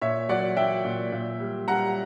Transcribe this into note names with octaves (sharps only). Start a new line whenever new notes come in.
A#2 C#5 E5
F#3 D5 F#5
F#3 E5 G5
A#2
A#2
G3
G3 F#5 A#5